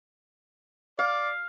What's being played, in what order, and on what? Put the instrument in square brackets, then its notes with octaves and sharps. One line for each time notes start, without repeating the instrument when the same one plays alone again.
[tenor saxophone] D5 [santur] F5